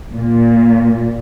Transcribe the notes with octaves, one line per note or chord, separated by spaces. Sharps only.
A#2